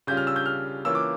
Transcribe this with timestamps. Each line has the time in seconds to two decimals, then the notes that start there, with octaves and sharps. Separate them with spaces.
0.07 C#3 G3 C#4 F4 G6
0.17 F6
0.27 E6
0.36 G6
0.46 F6
0.85 E3 A#3 C#4 F4 E6
0.95 D6